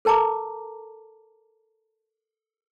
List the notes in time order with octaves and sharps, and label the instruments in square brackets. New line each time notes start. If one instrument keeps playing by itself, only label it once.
[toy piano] A4 A#4 A5 A#5 D6